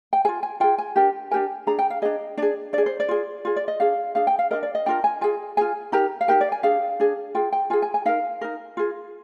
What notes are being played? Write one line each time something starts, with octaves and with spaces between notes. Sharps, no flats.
G5
F4 G#4 G#5
G#5
F4 G#4 G5
G#5
D4 G4 A#4 G5
D4 G4 A#4 G#5
D4 G#4 A#5
G5
F5
D4 G#4 D#5
D4 G#4 D5
D4 G#4 D5
C5
D5
F4 G#4
F4 G#4
D5
D#5
D4 G#4 F5
D4 G#4 F5
G5
F5
D4 F4 A#4 D#5
D5
D#5
D4 F4 A#4 G5
G#5
F4 G#4 G#5
F4 G#4 G#5
D#4 G4 A#4 A#5
F5
D#4 G4 A#4 G5
D5
G#5
D4 G#4 F5
D4 G#4
F4 G#4 G5
G5
F4 G#4 G#5
G#5
G#5
D#4 A#4 F5
D#4 A#4
F4 G#4